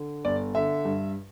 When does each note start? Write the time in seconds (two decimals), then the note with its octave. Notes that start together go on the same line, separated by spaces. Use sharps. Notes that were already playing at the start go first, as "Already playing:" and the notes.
Already playing: D3
0.25 G1 D5
0.55 D3 E5
0.85 G2